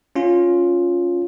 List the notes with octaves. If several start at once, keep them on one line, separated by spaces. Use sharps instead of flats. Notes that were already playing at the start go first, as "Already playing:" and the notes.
C#4 F4